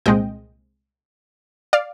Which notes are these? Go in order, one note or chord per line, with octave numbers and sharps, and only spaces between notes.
C2 A#2 G#3 C4 D#5 G5
D5 F5